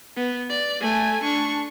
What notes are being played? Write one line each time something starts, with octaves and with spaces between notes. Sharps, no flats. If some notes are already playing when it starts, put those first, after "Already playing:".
B3
D5
A3 G#5
D4 C#6